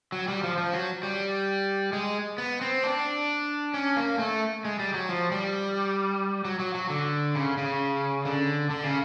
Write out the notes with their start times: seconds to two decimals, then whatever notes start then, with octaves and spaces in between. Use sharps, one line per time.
0.12 F#3
0.28 G3
0.43 F3
0.58 F3
0.73 F#3
1.03 G3
1.93 G#3
2.38 B3
2.61 C4
2.83 D4
3.74 C#4
3.96 A#3
4.19 A3
4.65 G#3
4.79 G3
4.94 F#3
5.09 F3
5.32 G3
6.45 F#3
6.59 F#3
6.74 F#3
6.90 D3
7.35 C#3
7.58 C#3
8.25 D3
8.70 D3
8.84 C#3